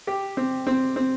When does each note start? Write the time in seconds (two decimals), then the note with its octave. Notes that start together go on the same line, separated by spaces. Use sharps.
0.07 G4
0.37 C4
0.67 C4
0.96 C4